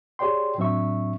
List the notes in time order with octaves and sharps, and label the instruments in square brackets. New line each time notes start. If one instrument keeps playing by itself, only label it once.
[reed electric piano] G4 G#4 C#5 D5 G5 C6
A2 F#3 C4 D4 E5 C#6